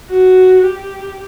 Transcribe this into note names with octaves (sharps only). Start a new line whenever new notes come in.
F#4
G4